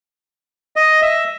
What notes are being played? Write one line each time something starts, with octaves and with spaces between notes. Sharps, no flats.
D#5
E5